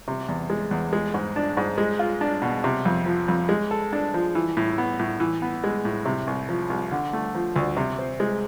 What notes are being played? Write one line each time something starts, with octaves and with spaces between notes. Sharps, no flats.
C3
E2
G#3
E2
G#3
G#2
D4
G#2
G#3
F4
D4
B2
C3
F2
F3
F2
G#3
A4
D4
F3
E3
A2
B3
A2
E3
B3
G#3
A2
C3
C2
F3
C2
D3
A3
F3
D2
C3
C4
G#3